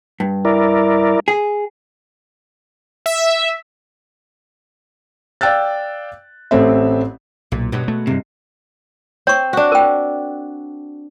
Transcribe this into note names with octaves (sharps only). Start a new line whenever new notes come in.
G2
E4 A#4 D5
G#4
E5
D5 F5 G5 E6 F#6 A6
A1 A3 C4 E5
B1 A#2
G2 B2 F#3 G#3
A3
G2 C3 G#3
C4 C#5 C#6
D4 F#4
A#4 G5